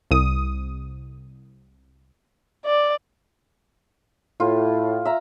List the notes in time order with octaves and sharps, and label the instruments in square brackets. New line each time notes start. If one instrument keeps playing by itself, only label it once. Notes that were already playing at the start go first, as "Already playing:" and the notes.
[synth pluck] C2 D#6
[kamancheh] D5
[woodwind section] A2 [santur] F4
[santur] E5 A#5